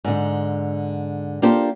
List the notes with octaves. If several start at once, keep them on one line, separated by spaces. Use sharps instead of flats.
G#2 D3
A#3 D4 F4 G4 A4 C5